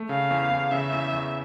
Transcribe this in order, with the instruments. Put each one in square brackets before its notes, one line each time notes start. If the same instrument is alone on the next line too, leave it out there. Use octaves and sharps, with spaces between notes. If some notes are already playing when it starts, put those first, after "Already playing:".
Already playing: [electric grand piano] A3
[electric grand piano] C#3 [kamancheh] F5
[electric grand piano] E2
E2
[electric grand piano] C#3 [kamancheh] E5
[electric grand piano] E2
E2